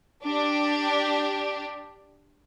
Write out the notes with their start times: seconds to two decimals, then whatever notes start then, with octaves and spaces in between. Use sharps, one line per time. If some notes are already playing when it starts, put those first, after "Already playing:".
0.24 D4 G4